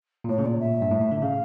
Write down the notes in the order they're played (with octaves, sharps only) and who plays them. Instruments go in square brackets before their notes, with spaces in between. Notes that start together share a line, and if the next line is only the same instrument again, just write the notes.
[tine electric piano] A#2
[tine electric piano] A2 [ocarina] C#5
[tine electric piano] C#3
[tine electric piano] A#2 [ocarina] D5
[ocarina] E5
[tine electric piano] G2
A2
A2
D3
[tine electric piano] C#3 [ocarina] F5